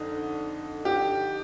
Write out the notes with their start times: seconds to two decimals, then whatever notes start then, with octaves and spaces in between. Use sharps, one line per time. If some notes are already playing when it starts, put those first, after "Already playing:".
Already playing: F2 D3 D#4
0.85 G4